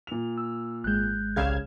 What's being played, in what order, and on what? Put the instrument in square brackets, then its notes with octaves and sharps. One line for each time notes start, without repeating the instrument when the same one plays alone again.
[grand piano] A#2 F7
[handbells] E6
[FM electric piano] G#1 G#3 [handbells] F#6 G6
[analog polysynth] C2 F5 G#6 [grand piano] C#3 E7